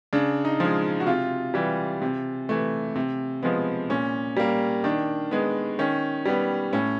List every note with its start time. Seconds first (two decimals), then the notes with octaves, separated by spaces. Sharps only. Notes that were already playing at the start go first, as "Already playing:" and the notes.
0.13 C#3 D4
0.45 D#4
0.60 F3 G#3
1.00 F#4
1.07 C3 F4
1.54 E3 G3
2.02 C3
2.49 E3 A3
2.95 C3
3.43 F3 G#3 B3
3.90 A#2 C#4
4.37 G3 A#3
4.84 D#3 D4
5.31 G#3 B3
5.79 D#3 C#4
6.26 G3 B3
6.73 A2 C#4